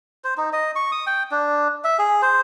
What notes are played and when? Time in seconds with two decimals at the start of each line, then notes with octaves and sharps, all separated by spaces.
0.24 C5
0.37 D#4
0.53 D#5
0.76 C#6
0.92 D#6
1.07 G5
1.31 D4
1.84 E5
1.99 G#4
2.22 C5